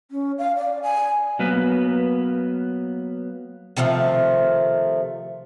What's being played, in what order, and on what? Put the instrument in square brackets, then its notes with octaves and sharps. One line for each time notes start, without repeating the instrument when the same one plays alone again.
[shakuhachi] C#4
F5
D5
G#5
[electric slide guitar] F#3 A#3 B3 B4
[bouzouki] C3 D#3 F3 A3